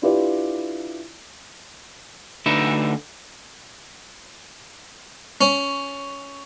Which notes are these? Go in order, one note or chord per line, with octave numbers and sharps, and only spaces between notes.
D4 E4 F4 G4 B4 D5
D2 D3 D#4 B4 E5
C#4